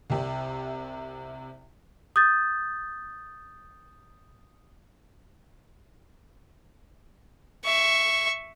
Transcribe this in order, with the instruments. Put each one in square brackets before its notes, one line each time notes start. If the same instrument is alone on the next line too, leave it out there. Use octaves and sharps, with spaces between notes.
[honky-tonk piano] C2 C3
[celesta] D#6 G6 A6
[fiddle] E5 C#6